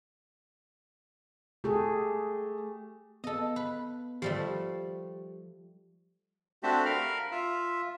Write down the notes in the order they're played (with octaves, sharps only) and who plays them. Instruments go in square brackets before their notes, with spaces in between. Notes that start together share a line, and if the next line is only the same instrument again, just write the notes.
[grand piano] A3 [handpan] G4 G#4
[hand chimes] B3 [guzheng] A4 D#5
[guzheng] B4
[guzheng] F3 G3 A3 [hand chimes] G4
[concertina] A3 C4 D4 F#4 G4 E5
A#4 F5 B5 F6
F4 E5